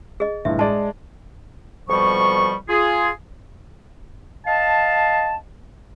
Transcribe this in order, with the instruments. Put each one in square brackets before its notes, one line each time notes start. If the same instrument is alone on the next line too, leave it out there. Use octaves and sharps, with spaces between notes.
[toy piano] G#4 D#5
[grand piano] G1 A2 [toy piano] E5
[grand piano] G#3 D5 [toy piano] A5
[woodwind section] F2 B2 F3 G3 C#6
F4 G#4
D#5 F5 A5